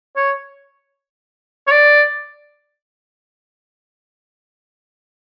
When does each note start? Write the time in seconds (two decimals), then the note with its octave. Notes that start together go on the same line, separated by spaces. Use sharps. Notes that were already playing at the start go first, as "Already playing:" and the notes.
0.16 C#5
1.67 C#5
1.71 D5